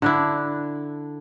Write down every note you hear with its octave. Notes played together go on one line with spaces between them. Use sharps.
D3 D4 E4